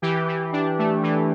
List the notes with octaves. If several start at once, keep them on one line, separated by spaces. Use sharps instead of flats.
E3 G4
E3
D4
A3
E3